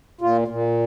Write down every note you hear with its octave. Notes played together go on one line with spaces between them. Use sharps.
A#2 F4
A#2